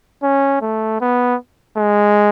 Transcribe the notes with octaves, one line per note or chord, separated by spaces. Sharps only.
C#4
A3
B3
G#3